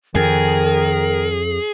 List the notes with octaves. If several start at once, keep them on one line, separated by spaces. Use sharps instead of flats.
F2 D#3 G#4 A#4